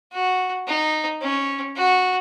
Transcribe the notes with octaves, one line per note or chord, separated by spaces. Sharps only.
F#4
D#4
C#4
F#4